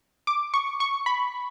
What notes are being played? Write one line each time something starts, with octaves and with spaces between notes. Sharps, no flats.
D6
C#6
C#6
B5